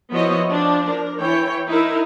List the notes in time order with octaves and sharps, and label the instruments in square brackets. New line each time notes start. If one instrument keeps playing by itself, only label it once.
[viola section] F3 B3 E4 F#4 C#5 D#5
F3 D4
A#4
E3 C#5 G5
D#4 E4 A#4